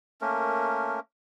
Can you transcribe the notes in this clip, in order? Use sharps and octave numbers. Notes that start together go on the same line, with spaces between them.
A3 A#3 C#4 A#4